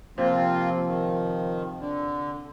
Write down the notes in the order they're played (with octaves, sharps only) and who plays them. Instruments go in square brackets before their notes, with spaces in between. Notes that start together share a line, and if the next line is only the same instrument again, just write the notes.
[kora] C3 [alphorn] F3 [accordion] A#3 C4 F4
[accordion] D#3
D3